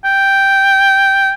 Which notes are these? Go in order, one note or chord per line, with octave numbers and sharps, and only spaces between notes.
G5